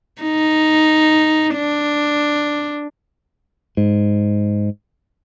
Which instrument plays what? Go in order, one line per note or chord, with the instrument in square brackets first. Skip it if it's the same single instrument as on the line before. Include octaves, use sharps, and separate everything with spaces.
[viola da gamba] D#4
D4
[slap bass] G#2